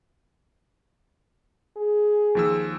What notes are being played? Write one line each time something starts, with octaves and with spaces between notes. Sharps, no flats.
G#4
D#2 F3 E6